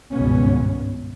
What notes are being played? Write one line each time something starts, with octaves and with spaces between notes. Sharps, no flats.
G#1 C#2 G2 B2 B3 C#4